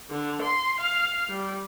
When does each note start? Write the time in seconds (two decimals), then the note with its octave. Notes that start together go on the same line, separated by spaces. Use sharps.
0.10 D3
0.42 C6
0.80 F5
1.29 G3